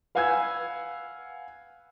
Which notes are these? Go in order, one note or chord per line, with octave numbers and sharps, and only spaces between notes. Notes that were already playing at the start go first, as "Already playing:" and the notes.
B4 F5 F#5 G#5 E6 G#6